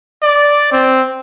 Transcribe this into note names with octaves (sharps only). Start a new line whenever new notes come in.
D5
C4